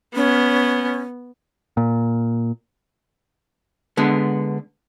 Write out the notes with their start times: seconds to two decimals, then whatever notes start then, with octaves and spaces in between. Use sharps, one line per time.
0.16 B3 C#4
1.77 A#2
3.97 D3 G#3 B3